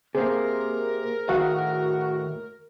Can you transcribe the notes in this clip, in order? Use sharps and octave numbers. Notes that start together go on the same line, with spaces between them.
C3 A#3 G#4 A#4 C5
A2 D#3 F#4 F5